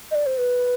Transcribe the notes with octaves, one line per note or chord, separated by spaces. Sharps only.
D#5
D5
C5
B4